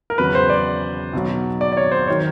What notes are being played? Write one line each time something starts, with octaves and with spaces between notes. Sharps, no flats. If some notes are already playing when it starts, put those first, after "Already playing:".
A#4
E2 C#3 F#3 B4
C5
D5
B1 B2 F#3
D5
D5
C#5
C5
D#3 F#3 C#5